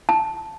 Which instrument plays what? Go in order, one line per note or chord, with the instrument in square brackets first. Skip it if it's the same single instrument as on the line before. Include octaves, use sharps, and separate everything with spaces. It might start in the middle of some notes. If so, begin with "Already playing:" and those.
[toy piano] A5